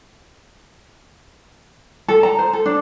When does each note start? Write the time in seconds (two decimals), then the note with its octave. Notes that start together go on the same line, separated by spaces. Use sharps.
2.08 A4
2.23 A#5
2.39 C5
2.53 A4
2.66 D4